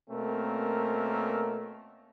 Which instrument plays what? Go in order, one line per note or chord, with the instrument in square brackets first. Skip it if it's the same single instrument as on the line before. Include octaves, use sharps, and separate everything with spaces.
[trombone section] B2 A3 A#3 C4 C#4 A#4